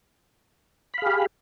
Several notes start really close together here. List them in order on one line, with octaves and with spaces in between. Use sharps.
B5 F5 G#4 G4